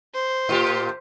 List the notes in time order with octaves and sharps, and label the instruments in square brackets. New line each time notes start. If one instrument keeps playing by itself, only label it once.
[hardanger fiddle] C5
[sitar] A2 F4 G4